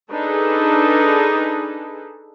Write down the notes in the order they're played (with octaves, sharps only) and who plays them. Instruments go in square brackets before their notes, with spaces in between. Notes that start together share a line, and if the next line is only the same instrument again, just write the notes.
[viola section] D4 D#4 G#4 A4 B4